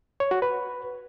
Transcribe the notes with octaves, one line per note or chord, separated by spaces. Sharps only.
C#5
F#4
B4